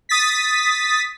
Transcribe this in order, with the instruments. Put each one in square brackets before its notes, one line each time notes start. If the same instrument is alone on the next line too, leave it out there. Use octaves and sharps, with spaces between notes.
[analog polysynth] D#6 A6 B6